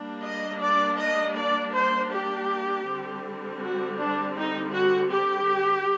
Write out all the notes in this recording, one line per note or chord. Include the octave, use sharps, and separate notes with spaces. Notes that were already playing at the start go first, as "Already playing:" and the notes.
Already playing: G3 A#3 D4
D#5
D5
D#5
D5
C5
G4
D3 G3 C4
F#4
D4
D#4
F#4
G4